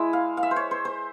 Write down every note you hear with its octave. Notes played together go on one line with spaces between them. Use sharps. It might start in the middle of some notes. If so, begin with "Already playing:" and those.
Already playing: G#3 E4
F5
F5
E5
C5
C#5
C5
C5